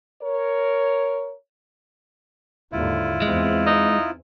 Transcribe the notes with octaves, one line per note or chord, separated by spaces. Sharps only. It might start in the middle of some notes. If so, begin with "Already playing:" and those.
A#4 C#5
D#2 G#2 D3 E4 F4
E2 G#3 C4
D#4